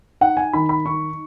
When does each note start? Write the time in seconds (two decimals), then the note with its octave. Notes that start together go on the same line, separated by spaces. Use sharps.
0.21 D#4 F#5
0.37 G#5
0.53 D#3 B5
0.69 B5
0.85 D#4 C#6